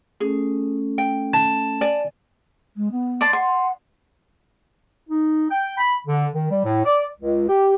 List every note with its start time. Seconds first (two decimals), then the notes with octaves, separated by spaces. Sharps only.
0.20 A3 C#4 G#4 A4
0.98 G5
1.34 A5
1.81 D5 G#5
2.76 G#3
2.91 B3
3.21 D5 A5 C6
3.33 F#5 C6
5.09 D#4
5.51 G5
5.78 B5
6.07 D3
6.34 D#3
6.50 G3
6.65 A2
6.85 D5
7.18 C#2
7.49 G4